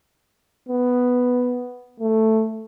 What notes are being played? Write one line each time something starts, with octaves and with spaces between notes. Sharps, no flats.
B3
A3